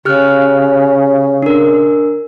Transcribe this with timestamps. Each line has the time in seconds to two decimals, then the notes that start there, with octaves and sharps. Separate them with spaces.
0.05 C#3 G4 F6 F#6
1.42 D4 A#4